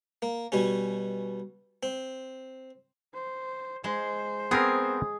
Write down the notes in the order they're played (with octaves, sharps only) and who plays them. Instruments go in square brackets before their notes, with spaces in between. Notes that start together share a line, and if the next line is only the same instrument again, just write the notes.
[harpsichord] A#3
B2 G3 C#4
C4
[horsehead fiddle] C5
[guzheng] G#3 [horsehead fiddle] C5
[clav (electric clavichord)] B3 C4 A#4 [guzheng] G#4